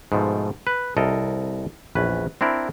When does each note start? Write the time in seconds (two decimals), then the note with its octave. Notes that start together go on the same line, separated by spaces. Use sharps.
0.12 G#2 B2 F3 A3
0.67 B4
0.97 C2 A4 A#4 D#5
1.95 A#1 E2 C#4 B4
2.41 C4 D4 E4 A#4